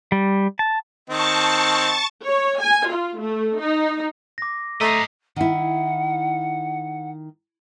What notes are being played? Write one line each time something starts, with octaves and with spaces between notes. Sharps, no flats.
G3
A5
D#3 C4 D#5 A5 C#6 A6
C#5
G#5
F4
A3
D#4
D6 A#6
A3 A4 D#5 A#5 B6 C7
D#3 E4 F#5